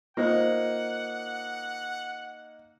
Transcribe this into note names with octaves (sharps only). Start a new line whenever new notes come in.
A#3 D#4 F4 C5 F#5